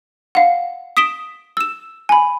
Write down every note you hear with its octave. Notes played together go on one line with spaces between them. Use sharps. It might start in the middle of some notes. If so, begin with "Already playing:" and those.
F5 F#5
D#6 B6 D7 E7 G7
E6 E7
G#5 B5